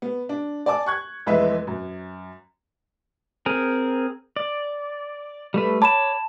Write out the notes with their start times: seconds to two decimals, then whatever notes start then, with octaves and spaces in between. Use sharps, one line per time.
0.02 B3
0.29 D4
0.66 D5 G#5 A5 D6
0.86 C#6 F#6 G#6
1.27 F1 E2 G#3 B4 E5
1.67 F#2
3.46 C4 G#4 A#4
4.36 D5
5.54 G3 A3 B4
5.82 C#5 A5 B5 D6 E7